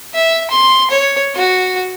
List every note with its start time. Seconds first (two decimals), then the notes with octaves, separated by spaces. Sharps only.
0.14 E5
0.50 C6
0.90 C#5
1.35 F#4